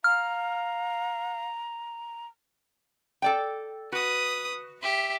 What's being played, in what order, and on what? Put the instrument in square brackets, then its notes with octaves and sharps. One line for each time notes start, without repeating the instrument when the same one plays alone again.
[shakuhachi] F5 [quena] A#5 [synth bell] F6
[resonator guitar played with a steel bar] A4 D5 G5
[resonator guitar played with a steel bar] F#4 [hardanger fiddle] B4 D#6
[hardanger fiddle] G4 E5